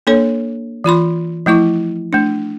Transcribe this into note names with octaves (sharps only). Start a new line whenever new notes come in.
A#3 D4 A4 C#5
E3 F4 B5 C6
F3 A3 E4 C#6
A3 D4